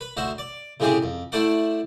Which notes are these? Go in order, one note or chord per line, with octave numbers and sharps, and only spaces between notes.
B4
D2 F#4 C5 E5
D5
A2 C#3 G#3 C4 G4 G#4
F2
A3 E4 C5 D5 F#5